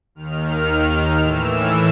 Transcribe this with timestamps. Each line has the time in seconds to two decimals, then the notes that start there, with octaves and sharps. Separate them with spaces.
0.15 D#2 D#3 F6
1.19 A2 E3 E6